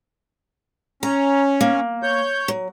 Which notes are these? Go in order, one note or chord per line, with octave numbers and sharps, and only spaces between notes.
C#4 A#5
A#3
C#5 G6
F#3